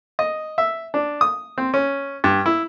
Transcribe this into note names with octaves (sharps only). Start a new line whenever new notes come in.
D#5
E5
D4
D#6
C4
C#4
G2
E4